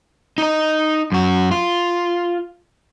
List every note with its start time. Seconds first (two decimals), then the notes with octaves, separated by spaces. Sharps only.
0.38 D#4 D#5
1.12 F#2 F#4
1.51 F4